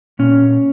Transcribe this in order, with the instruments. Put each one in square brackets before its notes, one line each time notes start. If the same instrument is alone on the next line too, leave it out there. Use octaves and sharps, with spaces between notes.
[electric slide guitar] A#2 C#4